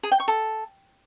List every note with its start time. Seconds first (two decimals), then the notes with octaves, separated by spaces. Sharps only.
0.03 G#4
0.12 G5
0.20 C#6
0.28 A4